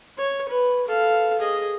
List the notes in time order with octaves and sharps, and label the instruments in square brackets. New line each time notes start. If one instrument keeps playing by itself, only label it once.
[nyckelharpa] C#5
B4
A4 F5
G#4 D#5